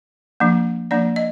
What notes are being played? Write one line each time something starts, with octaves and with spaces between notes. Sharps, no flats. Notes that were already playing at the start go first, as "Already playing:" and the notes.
F3 A#3 D4
F3 A#3 D4 D5
D#5